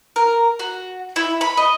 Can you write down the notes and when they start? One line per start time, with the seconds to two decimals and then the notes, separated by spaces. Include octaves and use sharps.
0.16 A#4
0.59 F#4
1.16 E4
1.41 B5
1.57 D#5